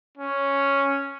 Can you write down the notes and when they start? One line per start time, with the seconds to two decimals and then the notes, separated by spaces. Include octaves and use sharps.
0.17 C#4